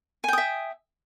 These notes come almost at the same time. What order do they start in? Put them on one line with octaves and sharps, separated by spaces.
G#5 G5 D#6 E5